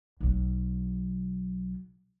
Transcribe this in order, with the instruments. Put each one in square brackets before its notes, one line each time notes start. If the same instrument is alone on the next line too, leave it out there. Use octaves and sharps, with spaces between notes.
[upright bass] B1 F#3